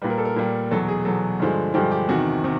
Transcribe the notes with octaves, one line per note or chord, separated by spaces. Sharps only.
A#2 G3 B4
A#4
A4
A#4
A#2 G3
E2 B2 F#3 A4
G#4
E2 B2 F#3 A4
G2 D3 F3 G#3
G2 D3 F3 G#3 G4
G4
E2 C3 D#3 F#4
C3 D#3